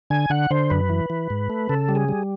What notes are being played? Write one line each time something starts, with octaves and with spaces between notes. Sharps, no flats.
D3 G#5
D3 F#5
D3 C5
F#2 B4
E3
E3
G#2
A3
C#3 A4
G3
G#4
G3